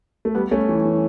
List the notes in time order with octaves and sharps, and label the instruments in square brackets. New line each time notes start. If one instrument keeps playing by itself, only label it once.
[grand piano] A3
G3 B3
A3 C#4
E3
E3